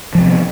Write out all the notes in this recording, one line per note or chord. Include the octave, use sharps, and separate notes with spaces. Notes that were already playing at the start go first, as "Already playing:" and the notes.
C3 F3 B3 C4